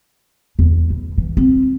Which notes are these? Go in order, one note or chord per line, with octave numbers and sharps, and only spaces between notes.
E2
A2
E3
C4